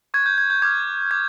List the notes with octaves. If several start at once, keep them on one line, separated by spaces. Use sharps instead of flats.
C#6 F#6 G#6
G6
G#6
G6
D6 F6 G#6
D6 G#6